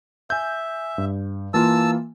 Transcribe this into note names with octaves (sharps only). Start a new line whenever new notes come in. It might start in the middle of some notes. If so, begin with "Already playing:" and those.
E5 G#5 G6
G2
E3 A#3 F4 A5 E6